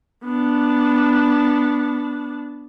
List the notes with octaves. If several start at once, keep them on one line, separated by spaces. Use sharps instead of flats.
B3 D4